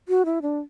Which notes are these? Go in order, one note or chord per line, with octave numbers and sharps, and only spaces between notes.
F#4
E4
D4